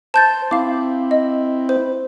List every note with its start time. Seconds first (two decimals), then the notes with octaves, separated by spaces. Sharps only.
0.14 C5 A5 G6 A6
0.51 C4 E4 F5 D6
1.11 D#5
1.69 C5